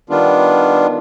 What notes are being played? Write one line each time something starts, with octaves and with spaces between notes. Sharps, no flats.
D#3 G3 B3 D4 F4